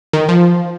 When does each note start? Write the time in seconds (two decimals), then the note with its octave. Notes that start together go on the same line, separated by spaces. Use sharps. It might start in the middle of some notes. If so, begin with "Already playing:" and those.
0.13 D#3
0.29 F3